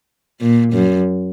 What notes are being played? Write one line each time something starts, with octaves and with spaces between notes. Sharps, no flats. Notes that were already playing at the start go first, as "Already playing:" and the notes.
A#2
F#2